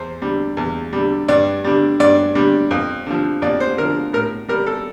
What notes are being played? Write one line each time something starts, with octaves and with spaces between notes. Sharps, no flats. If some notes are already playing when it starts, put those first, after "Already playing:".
Already playing: E2 C5
D3 G3
E2
D3 G3
G2 D5
D3 G3
G2 D5
D3 G3
F2
D3 F3
F2 D5
C5
D3 F3 A#4
A2 A#4
G3 A#4
A4